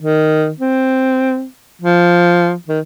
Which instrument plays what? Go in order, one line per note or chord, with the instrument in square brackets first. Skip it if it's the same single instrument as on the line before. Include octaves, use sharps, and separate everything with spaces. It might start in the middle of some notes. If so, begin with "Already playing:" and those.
[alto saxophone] D#3
C4
F3
D#3